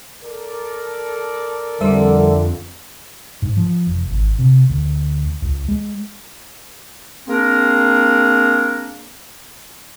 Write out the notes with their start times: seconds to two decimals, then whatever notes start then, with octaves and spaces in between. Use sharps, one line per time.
0.24 A4 A#4 D5
1.81 F2 D3 G3 C5 E5
3.42 G#2
3.57 F3
3.86 F1
4.10 G#1
4.39 C3
4.69 D2
5.42 C#2
5.68 G#3
7.28 A#3 C4 D4 G#4 A#4